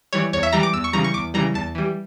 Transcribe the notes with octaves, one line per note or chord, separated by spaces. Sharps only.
E3 G3 C#5
E2 C#5
E5
E3 G3 A#5
D6
E2 E6
C#6
C#3 E3 G3 A#5
C#6
E2 D6
C#3 E3 G3 A#5
E2 A5
E3 G3